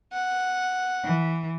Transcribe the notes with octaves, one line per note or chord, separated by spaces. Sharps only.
F#5
E3